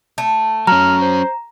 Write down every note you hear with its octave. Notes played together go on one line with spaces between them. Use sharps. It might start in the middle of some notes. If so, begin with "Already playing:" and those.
A3
F#3 C#4 A#5 F6
C5